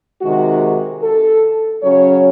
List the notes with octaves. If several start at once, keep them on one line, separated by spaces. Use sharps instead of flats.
C3 D#3 G#3 F#4
A4
C#3 F#3 C#4 C#5